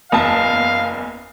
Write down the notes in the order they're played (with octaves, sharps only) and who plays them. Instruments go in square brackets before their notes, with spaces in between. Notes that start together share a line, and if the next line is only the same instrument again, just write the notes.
[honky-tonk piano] F#1 E2 A5 [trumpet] F5